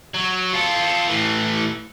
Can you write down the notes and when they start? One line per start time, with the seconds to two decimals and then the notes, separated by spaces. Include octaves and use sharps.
0.14 F#3
0.53 F4 A4
1.08 A2 E3